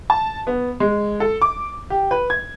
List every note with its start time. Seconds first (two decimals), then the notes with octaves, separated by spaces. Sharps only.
0.10 A5
0.47 B3
0.80 G#3
1.20 A4
1.42 D6
1.90 G4
2.11 B4
2.30 G#6